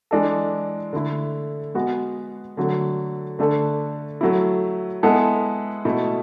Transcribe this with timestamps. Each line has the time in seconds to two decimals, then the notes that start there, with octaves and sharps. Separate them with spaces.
0.11 E3 G#3 D4 A4
0.93 D3 A3 E4
1.75 G#3 B3 F#4
2.57 D3 F#3 A3
3.39 D3 A3 D4 A4
4.21 F#3 A3 E4
5.03 G#3 B3 E4 A4
5.85 B2 A3 E4 A4